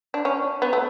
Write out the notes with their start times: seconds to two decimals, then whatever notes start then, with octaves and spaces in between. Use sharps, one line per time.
0.14 D4
0.25 C#4
0.62 B3
0.73 A3